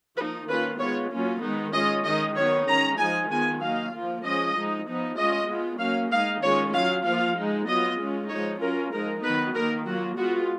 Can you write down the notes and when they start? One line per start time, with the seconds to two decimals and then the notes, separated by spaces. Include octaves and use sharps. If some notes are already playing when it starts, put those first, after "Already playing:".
0.18 F3 A#3 D#4 B4
0.49 D#3 A#3 C#4 F4 B4
0.80 G#3 B3 F4 C#5
1.12 F#3 A#3 C#4 F4
1.42 D#3 G#3 B3 D#4
1.73 G#3 C#4 F4 D#5
2.05 D#3 G#3 D#4 D#5
2.36 D#3 F#3 B3 D#4 C#5
2.67 D#3 G#3 C#4 A#5
2.99 F3 G#3 D#4 G#5
3.30 D#3 G#3 B3 F4 G#5
3.61 F#3 A#3 D#4 F5
3.93 F3 A#3 F4
4.23 F3 G#3 C#4 F4 D#5
4.55 F3 G#3 D#4
4.86 F3 B3 D#4
5.17 G#3 C#4 F4 D#5
5.49 G#3 B3 F4
5.80 F#3 A#3 C#4 F5
6.11 G#3 D#4 F5
6.42 D#3 G#3 C#4 F4 C#5
6.74 F#3 C#4 F4 F5
7.05 F3 A#3 F4 F5
7.36 G#3 D#4
7.67 F#3 B3 F4 D#5
7.99 G#3 C#4 F4
8.30 F3 G#3 D#4 C#5
8.61 F#3 C#4 F4 A#4
8.93 F3 G#3 D#4 A#4
9.23 D#3 F#3 B3 D#4 B4
9.55 D#3 A#3 D#4 A#4
9.86 F#3 A#3 F4 F#4
10.17 G#3 B3 F4 F#4